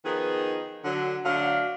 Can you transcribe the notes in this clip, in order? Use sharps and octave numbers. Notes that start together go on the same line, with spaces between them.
D#3 F3 B3 D#4 G#4
D3 F#3
D3 F#3 A3 D4 F5